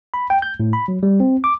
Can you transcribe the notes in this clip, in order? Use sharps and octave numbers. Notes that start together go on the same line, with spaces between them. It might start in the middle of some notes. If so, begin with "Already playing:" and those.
B5
G5
G6
A2
B5
F#3
G3
C4
D6